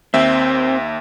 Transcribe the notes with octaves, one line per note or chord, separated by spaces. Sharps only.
D#2 C4 E5